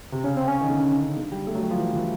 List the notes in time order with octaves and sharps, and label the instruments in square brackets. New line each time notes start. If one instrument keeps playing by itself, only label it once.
[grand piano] C3
[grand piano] C#3 [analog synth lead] C#4
[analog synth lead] C4
C#4
[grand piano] D#3
D3
D3
G3
A3
F#3
G3
F3
E3
E3